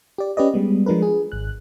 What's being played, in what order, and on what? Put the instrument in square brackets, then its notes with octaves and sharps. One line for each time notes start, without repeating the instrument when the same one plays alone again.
[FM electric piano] G4 D5
C#4 G4 B4 D5 D#5
G3 G#3 B3
F3 G#3 D4 A#4 B4
G#4
G#1 F#6